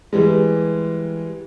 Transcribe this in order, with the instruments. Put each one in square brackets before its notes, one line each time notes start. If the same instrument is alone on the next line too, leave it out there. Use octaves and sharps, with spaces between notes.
[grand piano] E3 G3 G#3